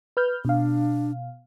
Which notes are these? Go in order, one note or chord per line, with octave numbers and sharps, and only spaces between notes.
B4 F6 G6
B2 D4 F5